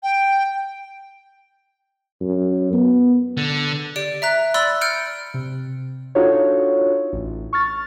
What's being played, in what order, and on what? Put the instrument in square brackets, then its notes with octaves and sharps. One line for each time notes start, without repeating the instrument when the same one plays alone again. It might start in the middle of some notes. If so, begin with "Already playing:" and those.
[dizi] G5
[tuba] F#2
B3
[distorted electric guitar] D3
[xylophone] G4 D5 D7
E5 A#5 F#6
D5 B5 C6 E6 F#6 A6
F6 G6 C#7 D7
[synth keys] C3
D4 D#4 F4 F#4 A4 C#5
A1
C#6 F6 A6